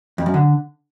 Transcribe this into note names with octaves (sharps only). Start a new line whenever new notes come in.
F2
F#2
D3